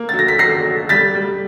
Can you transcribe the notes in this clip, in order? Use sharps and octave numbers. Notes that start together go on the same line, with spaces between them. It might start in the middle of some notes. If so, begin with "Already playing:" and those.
Already playing: A#3
F#3 A6
A#6
B6
F#3 A#6 C7
F#3
G3 A6 B6
G3